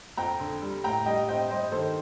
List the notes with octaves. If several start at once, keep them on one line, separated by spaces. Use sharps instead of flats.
F2 G5 A#5
D3
G3
A2 G5 A#5
G3 D#5 G5
C4 D#5 G5
G2 C5 D#5
D#3 A4 C5